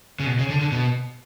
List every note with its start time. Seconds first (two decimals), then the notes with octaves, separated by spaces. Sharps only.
0.20 C#3
0.26 B2
0.39 C#3
0.50 D3
0.61 D3
0.72 B2